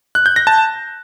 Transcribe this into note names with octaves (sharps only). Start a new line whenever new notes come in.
F#6
G6
A#6
A5